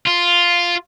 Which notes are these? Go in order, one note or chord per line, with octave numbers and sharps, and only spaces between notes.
F4